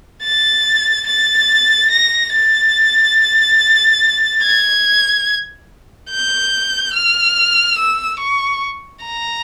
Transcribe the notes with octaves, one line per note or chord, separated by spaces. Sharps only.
A6
A6
A#6
A6
G#6
G6
F6
E6
C#6
A#5